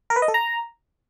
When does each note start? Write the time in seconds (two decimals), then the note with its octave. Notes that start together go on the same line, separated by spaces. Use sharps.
0.10 A#4
0.16 B4
0.22 D#5
0.28 A4
0.34 A#5